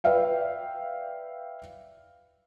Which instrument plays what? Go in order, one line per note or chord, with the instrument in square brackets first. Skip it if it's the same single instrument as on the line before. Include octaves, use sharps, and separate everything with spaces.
[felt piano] B4 D5 E5 F5 G5